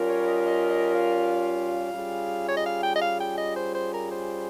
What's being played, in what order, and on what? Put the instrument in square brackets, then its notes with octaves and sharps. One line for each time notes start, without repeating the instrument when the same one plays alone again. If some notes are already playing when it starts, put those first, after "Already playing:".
Already playing: [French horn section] G3 C#4 F4 A#4
[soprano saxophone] C#5
D#5
F5
D#5
D#5
F5
[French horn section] G3 C#4 F4 G#4
[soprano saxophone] C#5
D#5
F5
G5
D#5
F5
G5
D#5
C5
C5
A#4
C5